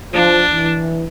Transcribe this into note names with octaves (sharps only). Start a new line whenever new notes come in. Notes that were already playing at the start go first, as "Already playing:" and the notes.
F3 D4
E3